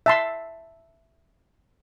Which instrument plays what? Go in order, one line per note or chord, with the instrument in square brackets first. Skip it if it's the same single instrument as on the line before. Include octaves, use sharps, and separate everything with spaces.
[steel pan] E5 A5 C6